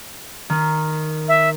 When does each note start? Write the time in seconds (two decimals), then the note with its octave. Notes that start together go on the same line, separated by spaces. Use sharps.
0.50 D#3
1.28 E5